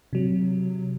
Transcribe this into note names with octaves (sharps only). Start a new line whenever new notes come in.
C3 F#3